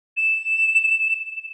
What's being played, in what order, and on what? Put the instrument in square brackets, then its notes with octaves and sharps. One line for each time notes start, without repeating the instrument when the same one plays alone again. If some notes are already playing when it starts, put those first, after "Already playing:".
[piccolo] E7